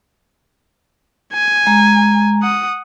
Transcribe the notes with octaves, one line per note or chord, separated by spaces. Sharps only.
G#5
G#3 A#5
F#5 D#6